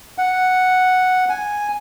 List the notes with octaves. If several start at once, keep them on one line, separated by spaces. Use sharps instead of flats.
F#5
G#5